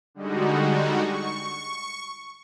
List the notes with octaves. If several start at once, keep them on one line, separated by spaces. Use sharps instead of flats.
D3 G3 G#3 D#4 F#4
C#6